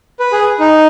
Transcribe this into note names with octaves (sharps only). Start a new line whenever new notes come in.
B4
G#4
D#4